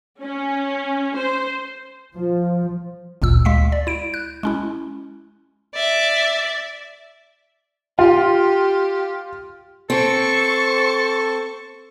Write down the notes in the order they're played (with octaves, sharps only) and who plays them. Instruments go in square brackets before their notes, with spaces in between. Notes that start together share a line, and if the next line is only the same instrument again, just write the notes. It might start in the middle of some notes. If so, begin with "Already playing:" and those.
[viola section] C#4
C5
[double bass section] F3
[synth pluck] G#1 D2 A#2 E6
D2 G#3 F5 B6
D5
E4 D7
F#6
G#3 C#4 E4
[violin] D5 E5
[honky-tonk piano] F4 [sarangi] G4
[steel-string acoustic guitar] C4 [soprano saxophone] A4 [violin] C5 C#6